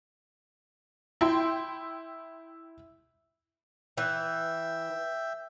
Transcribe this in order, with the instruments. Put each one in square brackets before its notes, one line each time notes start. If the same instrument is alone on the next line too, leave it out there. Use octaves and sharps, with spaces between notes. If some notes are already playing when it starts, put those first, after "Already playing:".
[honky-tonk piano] E4 G5 C6
[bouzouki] E3 [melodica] E5 G5